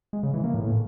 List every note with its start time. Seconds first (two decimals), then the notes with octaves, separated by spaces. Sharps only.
0.13 G#3
0.23 C#3
0.33 E3
0.44 A#3
0.54 A2